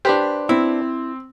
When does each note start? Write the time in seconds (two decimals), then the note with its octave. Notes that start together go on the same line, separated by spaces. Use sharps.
0.05 D4 G4 B4 C5
0.49 C4 E4